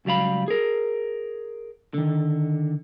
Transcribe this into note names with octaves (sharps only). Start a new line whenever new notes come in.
C#2 F#3 G3 F5 B5
G#4 A#4
D3 D#3